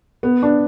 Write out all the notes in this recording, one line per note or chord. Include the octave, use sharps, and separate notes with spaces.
B3
D4